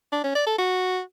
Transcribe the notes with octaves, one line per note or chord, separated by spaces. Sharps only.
D4
C#4
D5
A4
F#4